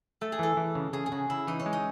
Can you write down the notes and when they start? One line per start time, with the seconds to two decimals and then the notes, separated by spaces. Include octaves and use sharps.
0.21 A3 A4
0.32 G#4
0.39 E3 A4
0.57 E3
0.75 C#3
0.93 C#3 G#4
1.06 G#4
1.12 C#3 F#4
1.29 C#3 E4
1.47 E3 D#4
1.60 C#4
1.66 G#3
1.73 D#4